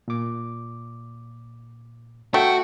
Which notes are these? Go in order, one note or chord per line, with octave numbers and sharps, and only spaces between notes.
A#2 D6
A3 F#4 G5 E6